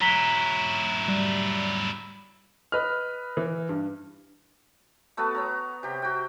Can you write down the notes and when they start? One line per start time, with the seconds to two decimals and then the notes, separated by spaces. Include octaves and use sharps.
0.01 F#3 E4 A#5 B6 G7
1.08 G3
2.72 B4 D#5 F6
3.37 E3
3.69 G2
5.17 A3 B3 F#4 A5
5.35 B3 C#5 A#5
5.83 C3 G4
6.02 F#4 G5